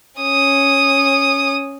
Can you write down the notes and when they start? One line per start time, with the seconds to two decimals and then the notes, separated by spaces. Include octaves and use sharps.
0.20 C#4 D#6